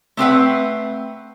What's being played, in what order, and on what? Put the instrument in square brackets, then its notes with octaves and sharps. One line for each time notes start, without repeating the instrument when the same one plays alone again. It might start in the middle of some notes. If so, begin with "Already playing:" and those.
[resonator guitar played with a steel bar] A3 C4 B4 F#5